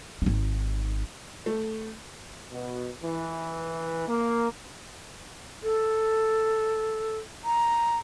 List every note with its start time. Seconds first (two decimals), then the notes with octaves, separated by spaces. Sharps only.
0.22 G#1 D#4
1.46 A3
2.52 B2
3.02 E3
4.08 A#3
5.63 A4
7.45 A#5